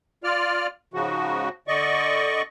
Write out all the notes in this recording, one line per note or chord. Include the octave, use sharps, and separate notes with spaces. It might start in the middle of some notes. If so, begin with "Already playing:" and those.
F4 D5 F6
G#2 C#3 F3 F#4
D3 D5 D#5 C#6